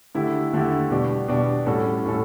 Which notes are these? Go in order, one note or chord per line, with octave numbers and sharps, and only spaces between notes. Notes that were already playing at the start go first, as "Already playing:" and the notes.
D3 A3 E4 G4
D3 A3 E4 G4
B2 G3 D4 G4
B2 G3 D4 G4
A2 G3 C#4 F#4 A4
A2 G3 C#4 F#4 A4